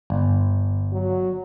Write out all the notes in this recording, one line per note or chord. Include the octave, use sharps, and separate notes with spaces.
G1
F#3